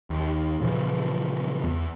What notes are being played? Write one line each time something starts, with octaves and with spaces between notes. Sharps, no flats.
D#2
A#2 C#3 E3 F3
E2